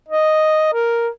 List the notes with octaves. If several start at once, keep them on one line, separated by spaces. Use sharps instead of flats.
D#5
A#4